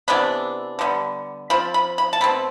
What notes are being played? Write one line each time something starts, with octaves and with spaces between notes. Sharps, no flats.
C3 E3 B3 D4 B5
D3 G3 B3
F3 C4 B5
B5
B5
A5
B2 A3 C4 B5